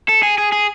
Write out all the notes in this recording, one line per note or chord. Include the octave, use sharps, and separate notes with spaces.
A4
G#4
G#4
G#4